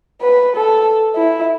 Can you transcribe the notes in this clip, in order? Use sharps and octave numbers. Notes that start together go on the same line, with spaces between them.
B4
A4
E4